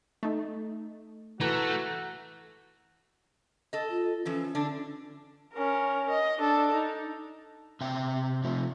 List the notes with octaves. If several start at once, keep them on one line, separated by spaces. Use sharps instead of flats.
A3 D#4
E3 A3 F#4 A#5
A4 D#5
F4
E3 F3 C#4 A4
D3 D4
C#4 A#4
D#5
D4 A4
D#4
C3 E5 G5
C3 F3 A3